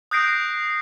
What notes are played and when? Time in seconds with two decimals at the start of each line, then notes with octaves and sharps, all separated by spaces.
0.11 D#6 F#6 G6 A#6 C7 D7